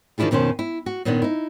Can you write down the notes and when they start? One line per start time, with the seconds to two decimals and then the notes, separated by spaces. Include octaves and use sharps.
0.18 D#3 F3 D4 E4 F4 G#4
0.31 F2 B2 D#3 C#4 C5
0.59 E4
0.86 F#4
1.05 A#2 D#3 A#3 B3 C#4 D4
1.22 D#4 E4